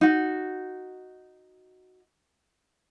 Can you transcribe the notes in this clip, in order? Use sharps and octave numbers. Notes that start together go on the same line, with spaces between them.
D#4 F#4